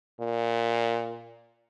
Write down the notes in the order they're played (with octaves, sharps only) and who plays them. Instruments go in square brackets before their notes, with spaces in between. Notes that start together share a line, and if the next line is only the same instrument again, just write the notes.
[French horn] A#2